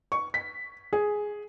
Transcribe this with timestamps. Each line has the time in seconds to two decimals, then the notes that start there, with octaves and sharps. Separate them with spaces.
0.12 C#6
0.34 B6
0.93 G#4